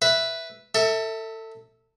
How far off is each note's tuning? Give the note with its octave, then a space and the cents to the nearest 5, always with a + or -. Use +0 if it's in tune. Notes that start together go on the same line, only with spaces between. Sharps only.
B4 +0 E5 +0
A4 +25 E5 -15